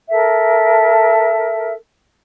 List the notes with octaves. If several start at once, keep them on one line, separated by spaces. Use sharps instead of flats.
A4 A#4 E5